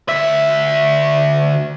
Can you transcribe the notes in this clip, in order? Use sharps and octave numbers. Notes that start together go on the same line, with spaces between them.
D2 E5